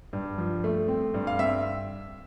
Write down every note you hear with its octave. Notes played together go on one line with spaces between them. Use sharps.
G2
F3
A3
C4
G2
F5
C4 E5